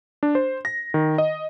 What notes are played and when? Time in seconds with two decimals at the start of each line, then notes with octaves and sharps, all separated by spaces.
0.23 D4
0.35 C5
0.65 A#6
0.94 D#3
1.18 D#5